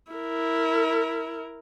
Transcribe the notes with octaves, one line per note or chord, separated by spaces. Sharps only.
E4 A#4